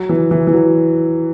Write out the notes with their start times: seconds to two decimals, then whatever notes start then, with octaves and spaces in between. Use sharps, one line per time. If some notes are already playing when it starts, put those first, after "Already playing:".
Already playing: F#3
0.09 E3
0.31 E3
0.47 E3
0.53 F#3